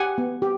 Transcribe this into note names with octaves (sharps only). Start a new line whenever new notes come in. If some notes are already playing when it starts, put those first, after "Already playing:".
Already playing: G4 F#5 G#5
B3
G4